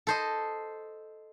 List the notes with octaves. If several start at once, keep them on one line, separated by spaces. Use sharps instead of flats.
A4 C5 D#5